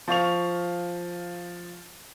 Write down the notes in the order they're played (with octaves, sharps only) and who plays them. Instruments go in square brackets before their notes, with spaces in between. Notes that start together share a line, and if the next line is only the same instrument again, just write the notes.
[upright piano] F3 F5 C#6 F7